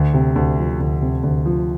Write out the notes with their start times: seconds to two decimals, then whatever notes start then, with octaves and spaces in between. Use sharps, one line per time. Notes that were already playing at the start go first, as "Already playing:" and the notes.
Already playing: D2
0.14 C3
0.36 D2
0.59 F3
0.81 D2
1.01 C3
1.23 D2
1.46 F3